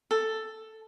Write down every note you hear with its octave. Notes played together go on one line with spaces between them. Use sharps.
A4